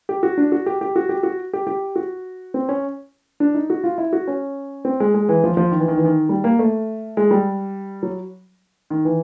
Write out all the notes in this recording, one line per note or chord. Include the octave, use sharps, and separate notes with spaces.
G4
F#4
D4
F#4
G4
G4
F#4
G4
F#4
G4
G4
F#4
C4
C#4
D4
D#4
F#4
F4
E4
F#4
C#4
C4
G#3
G#3
E3
F3
F3
D#3
E3
D#3
E3
D#3
G3
A#3
A3
G#3
G3
F#3
D#3
E3